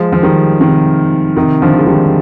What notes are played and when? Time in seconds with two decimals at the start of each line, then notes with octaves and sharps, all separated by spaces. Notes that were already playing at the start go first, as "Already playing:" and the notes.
Already playing: F3 G#3
0.12 F3
0.22 D#3 G3
0.60 C3 D#3
1.37 C3 D#3
1.62 D3 F3
1.78 G#3
1.86 D#3 G3